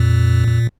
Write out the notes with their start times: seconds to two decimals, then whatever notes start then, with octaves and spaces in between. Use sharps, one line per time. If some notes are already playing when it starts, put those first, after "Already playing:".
Already playing: F2 A#2
0.48 F2